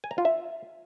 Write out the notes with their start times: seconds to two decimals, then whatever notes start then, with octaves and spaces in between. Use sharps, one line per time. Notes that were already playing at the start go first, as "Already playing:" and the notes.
0.04 G#5
0.11 A#5
0.18 F4
0.25 E5